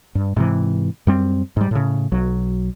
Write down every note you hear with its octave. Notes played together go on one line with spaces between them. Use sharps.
G2
G#2 C3 E3
F#2 G3 C4
G#2 G3
A2 C#3
B1 F#3